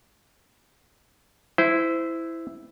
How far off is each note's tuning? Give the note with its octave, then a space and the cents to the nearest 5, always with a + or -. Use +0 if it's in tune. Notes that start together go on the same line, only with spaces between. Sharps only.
E4 +0 C5 -25